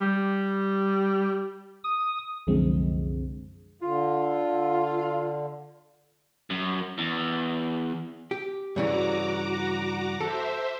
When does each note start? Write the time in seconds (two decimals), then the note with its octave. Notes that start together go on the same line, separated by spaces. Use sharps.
0.01 G3
1.84 D#6
2.47 C2 F#2 D3 F3 G#3 C4
3.82 D3 F4
6.50 F#2
6.98 E2
8.31 G4
8.76 G2 C#3 E3 F#4 A#5 D6
10.21 A4 C5 E5